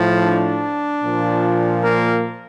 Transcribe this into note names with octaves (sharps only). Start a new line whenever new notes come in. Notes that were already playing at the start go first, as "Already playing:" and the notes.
Already playing: A2 F3
D4
A#2 F3
A#3